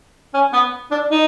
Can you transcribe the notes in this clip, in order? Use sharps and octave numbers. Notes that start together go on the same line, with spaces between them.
C#4
B3
D4
D#4